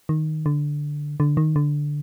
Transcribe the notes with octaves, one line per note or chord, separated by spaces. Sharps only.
D#3
D3
D3
D#3
D3